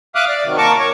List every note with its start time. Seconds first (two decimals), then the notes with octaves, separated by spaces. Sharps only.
0.15 E5 F5 D6 D#6 F6 F#6
0.29 D5
0.44 C3 D#3 F#3
0.57 A#3 A#4 A5 C#6 D6
0.79 C#5